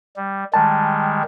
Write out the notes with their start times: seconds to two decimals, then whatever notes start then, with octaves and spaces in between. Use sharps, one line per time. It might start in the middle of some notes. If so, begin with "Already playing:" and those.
0.17 G3
0.54 D#3 G3 G#3 A5